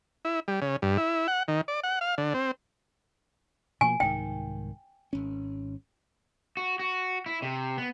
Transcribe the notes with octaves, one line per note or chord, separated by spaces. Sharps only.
E4
G3
C#3
G2
E4
F#5
D#3
D5
F#5
F5
D3
C4
B2 F3 A#3 G#5
C2 G#2 D#3 G5
G#1 C#4
F#4
F#4
E4
C3
B3